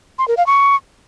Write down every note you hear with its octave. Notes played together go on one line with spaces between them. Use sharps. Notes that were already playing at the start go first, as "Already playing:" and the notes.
C6
A#4
F5
C#6